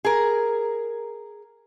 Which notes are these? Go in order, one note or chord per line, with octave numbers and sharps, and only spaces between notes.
G#4 A#4